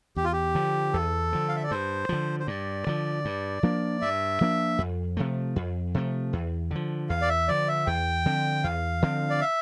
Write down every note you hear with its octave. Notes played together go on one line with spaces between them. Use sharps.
E2 G4
F4
G4
D3 F3
E2 A4
D3 F3
F5
E5
D5
G2 C5
D3 F3
C5
G2 D5
D3 F3
G2
F3 A#3 D4
G2 E5
F3 A#3 D4
F2
C3 F3 A3
F2
C3 F3 A3
E2
D3 F3
E2 F5
D5
E5
D3 F3 D5
E5
E2 G5
D3 F3 C4
E2 F5
D3 F3 C4
D5
E5